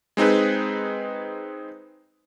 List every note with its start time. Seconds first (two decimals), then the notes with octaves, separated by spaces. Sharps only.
0.17 G#3 C4 D#4 G#4 B4